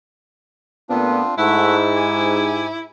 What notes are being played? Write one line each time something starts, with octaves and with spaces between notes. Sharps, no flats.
A#2 A3 B3 C4 D4 F4
G#2 A3 E4 E5 F#5
G4 G#5